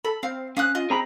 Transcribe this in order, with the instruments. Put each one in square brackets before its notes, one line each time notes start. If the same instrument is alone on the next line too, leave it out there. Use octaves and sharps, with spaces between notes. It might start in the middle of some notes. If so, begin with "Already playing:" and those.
[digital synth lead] A4 [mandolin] B5
[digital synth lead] C4 [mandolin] F5
[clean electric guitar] C#4 [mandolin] F5 D#6 F#6
[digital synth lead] F4 [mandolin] D#5
[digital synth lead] C4 [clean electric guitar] G#4 A#5 B5